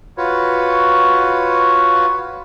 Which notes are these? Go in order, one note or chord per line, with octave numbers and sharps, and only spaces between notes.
F4 F#4 B4 C#5